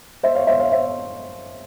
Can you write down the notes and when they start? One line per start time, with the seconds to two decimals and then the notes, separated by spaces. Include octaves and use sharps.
0.23 C5 E5
0.35 C#5 F5
0.47 C5 E5
0.59 C#5 F5
0.72 C5 E5